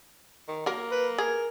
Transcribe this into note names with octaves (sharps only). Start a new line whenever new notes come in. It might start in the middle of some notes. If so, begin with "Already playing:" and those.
D#3
F#3 A#3 A#4
B4
G#4 A#4